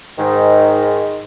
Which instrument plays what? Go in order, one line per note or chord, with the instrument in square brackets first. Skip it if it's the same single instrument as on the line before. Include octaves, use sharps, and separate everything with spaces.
[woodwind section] G#2 D#3